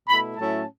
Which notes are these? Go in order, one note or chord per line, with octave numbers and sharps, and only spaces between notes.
B2 A3 E4 B5
A2 F#3 A3 C#4 E4 A5